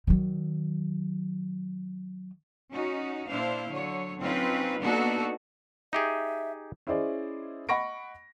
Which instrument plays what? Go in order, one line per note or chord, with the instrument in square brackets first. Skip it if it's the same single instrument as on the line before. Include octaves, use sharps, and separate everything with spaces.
[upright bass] D#3 F#3
[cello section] C#4 D#4 F#4
A#2 D4 E4 C5 F5
D3 F#3 C#5
F#3 C4 C#4 D#4 F4 B4
A#3 B3 D4 D#4 F#4 A4
[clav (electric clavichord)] D#4 G4 G#4 [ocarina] E5
[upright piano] C#4 E4 G#4 C5 D5 D#5
D#5 F#5 B5 C#6 A#6 D7